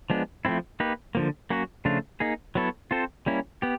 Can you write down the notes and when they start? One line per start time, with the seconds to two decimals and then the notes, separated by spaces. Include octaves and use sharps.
0.10 F3 G#3 B3 D4
0.45 F3 A3 C4 E4
0.80 A#3 D#4 G4 B4
1.15 D3 F3 A#3
1.50 F#3 A#3 C#4 F#4
1.85 C#3 F3 A3 D4 F4
2.20 A#3 D#4 G#4
2.55 F#3 B3 E4 A4 C#5
2.91 C4 F4 A4 C5
3.26 G3 A#3 C#4 E4
3.62 B3 G4